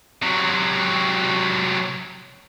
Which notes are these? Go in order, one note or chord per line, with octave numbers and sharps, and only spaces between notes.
C3 F#3